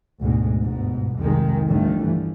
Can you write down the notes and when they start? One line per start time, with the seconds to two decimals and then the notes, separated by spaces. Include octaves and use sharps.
0.20 D2 G#2 B2 G#3
0.61 G1 G#2 B2
1.18 C2 F2 D#3 G#3
1.67 G1 D3 D#3 F3 G3 A3
2.03 E3 F3